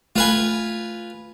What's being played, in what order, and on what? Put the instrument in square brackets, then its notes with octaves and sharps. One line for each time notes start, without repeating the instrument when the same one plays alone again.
[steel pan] A3 [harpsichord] F4 B4 G#5